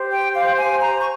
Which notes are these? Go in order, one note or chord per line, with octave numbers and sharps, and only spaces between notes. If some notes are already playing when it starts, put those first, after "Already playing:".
Already playing: G4 C5
G5
F5
G#5
A#5
C#6